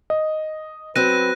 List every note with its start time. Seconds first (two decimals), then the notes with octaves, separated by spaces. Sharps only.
0.10 D#5
0.96 F#3 C4 B4 F#6 A#6 D#7